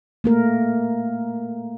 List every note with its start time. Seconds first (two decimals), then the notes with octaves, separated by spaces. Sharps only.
0.24 A3 A#3 A#4